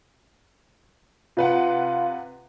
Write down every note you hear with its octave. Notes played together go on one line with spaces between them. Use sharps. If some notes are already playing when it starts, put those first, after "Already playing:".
C3 F4 B4 F#5